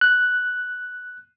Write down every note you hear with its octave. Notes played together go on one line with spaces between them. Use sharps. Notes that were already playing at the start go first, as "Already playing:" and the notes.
F#6